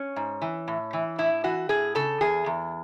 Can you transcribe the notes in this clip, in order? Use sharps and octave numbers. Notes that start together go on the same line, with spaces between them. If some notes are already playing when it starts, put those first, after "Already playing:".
Already playing: C#4
G#2
E3
A2
E3
A2 E4
E3 F#4
A2 G#4
C#3 A4
E2 G#4
E2